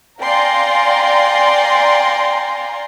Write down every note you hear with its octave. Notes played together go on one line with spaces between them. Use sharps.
D5 F5 G5 G#5 A#5 C6